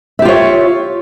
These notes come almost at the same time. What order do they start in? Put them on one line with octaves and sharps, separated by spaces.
E5 G4 F4 C#5